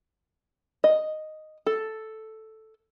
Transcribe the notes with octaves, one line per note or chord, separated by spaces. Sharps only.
D#5
A4